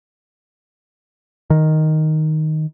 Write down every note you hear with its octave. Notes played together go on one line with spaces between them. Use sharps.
D#3